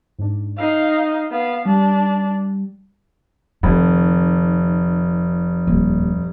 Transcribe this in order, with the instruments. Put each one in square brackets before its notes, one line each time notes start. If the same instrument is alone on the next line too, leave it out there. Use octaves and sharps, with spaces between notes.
[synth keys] G#2 D4
[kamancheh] D#4 F5 [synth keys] E6 C7 D#7
[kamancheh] B3 F5
[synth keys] G3 [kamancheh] D4
[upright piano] F1 [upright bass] D#3
[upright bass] D#1